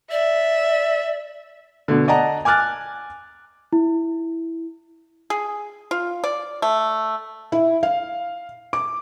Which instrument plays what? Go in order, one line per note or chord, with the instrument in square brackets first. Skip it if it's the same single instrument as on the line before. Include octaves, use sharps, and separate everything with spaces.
[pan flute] D5 [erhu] E5
[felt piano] B2 D3
D5 D#5 F#5 A5 A#5
G#5 D6 F6 F#6 A6
[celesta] E4
[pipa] G#4
F4
D5
A3
[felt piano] E4
F5
D6